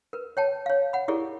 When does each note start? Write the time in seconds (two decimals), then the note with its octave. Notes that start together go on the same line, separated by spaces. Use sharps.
0.13 A#4 B4
0.37 C#5 G5 A5
0.66 C#5 F5
0.93 F#5 B5
1.08 E4 G4 G#4 A#4 D5